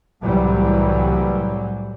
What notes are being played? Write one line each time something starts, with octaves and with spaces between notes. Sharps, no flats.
C2 A2 E3 F#3 G3